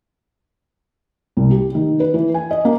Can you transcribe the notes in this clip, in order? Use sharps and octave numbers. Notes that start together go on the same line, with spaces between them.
C2
G4
D#3
B4
E3
G#5
D#5
A#3